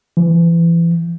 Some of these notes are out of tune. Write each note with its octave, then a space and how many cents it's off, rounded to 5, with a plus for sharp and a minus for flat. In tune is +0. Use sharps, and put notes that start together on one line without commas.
E3 +30